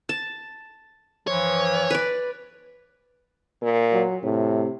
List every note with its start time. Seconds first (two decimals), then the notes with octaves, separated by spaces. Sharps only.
0.09 A5
1.27 G2 E3 F3 C#5
1.90 B4 D5
3.62 A#2
3.92 F#3
4.23 A2 C3